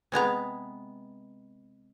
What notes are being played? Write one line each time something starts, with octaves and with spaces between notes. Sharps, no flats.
C3 G#3 B3 A#5